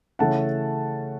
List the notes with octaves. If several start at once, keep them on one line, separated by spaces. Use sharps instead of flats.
C#3 E3 A3 C#4 F#5 A5